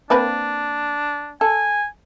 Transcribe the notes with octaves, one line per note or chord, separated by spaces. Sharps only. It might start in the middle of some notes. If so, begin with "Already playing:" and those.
A#3 C4 D4 B4
A4 G#5